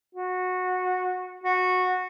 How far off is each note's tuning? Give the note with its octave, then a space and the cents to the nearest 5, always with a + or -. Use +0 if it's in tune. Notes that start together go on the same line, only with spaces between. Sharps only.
F#4 -15
F#4 -15